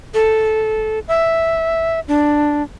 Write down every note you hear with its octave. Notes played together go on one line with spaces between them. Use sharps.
A4
E5
D4